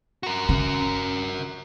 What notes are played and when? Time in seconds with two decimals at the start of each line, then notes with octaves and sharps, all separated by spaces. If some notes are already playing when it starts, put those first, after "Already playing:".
0.23 F#4 A#4
0.49 C#3